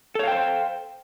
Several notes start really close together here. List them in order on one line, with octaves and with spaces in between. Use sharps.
A4 C#5 F5 G5 C5